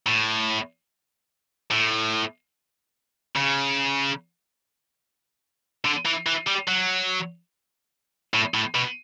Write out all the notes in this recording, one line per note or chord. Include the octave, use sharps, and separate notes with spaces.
A2
A2
C#3
D3
E3
E3
G3
F#3
A2
A2
B2